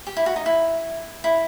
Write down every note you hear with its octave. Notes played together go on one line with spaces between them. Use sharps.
G4
E4
F#4
D#4
E4
E4